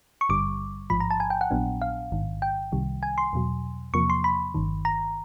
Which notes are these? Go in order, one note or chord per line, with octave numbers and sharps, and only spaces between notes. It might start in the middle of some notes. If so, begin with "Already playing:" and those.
C#6
G#1 G2 D3 G3 D6
A1 G#2 F3 B5
A#5
A5
G#5
G5
F#5
A#1 A#2 F#3 B3 D4
F5
A1 G#2 D#3
G5
C2 C3 D#3 G3
G#5
C6
E2 B2 F#3
E2 C3 F3 A#3 C#6
C6
B5
G1 G2 D#3
A#5